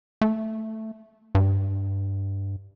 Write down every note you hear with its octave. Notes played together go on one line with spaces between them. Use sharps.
A3
G2